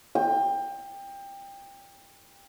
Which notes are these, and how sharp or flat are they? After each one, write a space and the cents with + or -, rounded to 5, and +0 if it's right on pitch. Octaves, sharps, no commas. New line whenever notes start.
G5 +20